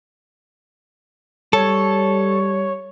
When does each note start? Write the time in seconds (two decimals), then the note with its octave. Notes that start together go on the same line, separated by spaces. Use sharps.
1.53 G3 A4 C#5